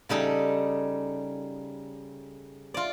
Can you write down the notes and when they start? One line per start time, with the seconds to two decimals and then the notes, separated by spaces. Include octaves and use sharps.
0.09 C#3 G3 D#4 A4
2.74 F4 D5